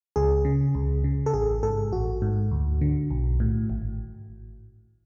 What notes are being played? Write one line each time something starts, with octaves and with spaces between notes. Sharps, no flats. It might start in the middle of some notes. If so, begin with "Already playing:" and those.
C#2 G#4
C#3
C#2
C#3
A4
A1 G#4
G#2 A4
A1 F#4
G#2
D2
D3
B1
A2
G#1